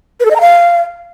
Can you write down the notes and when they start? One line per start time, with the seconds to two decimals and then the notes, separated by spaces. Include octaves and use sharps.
0.20 B4
0.25 A4
0.30 D#5
0.36 A#5
0.41 F5